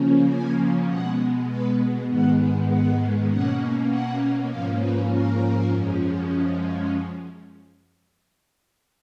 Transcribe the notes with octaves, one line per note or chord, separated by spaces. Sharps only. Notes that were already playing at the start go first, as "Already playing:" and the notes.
Already playing: C#3 F3 A#3 C#4
G#5
B2 G#3 B3 F#5
B4
G#2 D#3 G#3 B3 F#5
F#5
B2 A#3 C#4 F#5
F#5
G#2 F3 A#3 C#4 F5
B4
A#4
F#2 F3 G#3 C#4